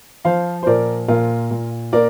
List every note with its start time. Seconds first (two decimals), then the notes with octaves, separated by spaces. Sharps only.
0.25 F3 C5 F5
0.63 C5
0.67 A#2 A#4 D5
1.08 A#2 F4 A#4
1.51 A#2
1.93 A#3 A#4 D5